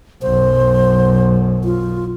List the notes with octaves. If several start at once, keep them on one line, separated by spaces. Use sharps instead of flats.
B1 F#2 C5
F4